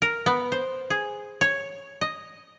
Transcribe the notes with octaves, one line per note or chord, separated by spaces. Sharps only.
A#4
B3
C5
G#4
C#5
D#5